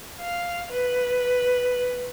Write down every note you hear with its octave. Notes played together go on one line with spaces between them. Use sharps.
F5
B4